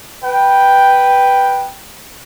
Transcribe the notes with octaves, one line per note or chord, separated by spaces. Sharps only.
B4 G5